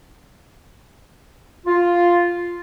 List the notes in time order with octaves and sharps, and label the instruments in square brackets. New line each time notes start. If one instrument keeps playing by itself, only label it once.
[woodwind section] F4